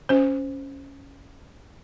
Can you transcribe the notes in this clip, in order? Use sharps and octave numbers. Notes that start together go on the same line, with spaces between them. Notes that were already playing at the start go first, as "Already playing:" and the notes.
C#4 C5